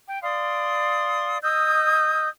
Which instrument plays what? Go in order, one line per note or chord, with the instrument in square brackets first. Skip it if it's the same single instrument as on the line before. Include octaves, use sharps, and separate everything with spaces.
[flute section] G5
D5 F5 C6 D#6
D#5 D#6 E6 G6